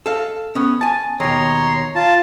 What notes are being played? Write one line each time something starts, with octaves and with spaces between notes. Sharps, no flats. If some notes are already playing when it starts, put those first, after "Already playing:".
A4 F5
B3 C#4
G#5 A5
D#2 B2 C#5 A#5 C6
F4 A5